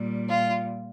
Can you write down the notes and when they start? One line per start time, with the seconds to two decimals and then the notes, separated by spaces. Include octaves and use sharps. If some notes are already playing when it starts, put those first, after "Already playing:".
Already playing: A#2 G3
0.29 F4